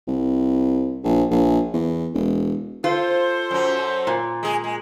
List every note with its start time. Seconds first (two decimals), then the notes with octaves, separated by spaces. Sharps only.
0.07 C2
1.04 A#1
1.31 A#1
1.73 E2
2.14 E1
2.84 F4 A4 C5
3.51 F#2 F#3
4.07 A#2
4.43 G#3 G#4
4.64 G#3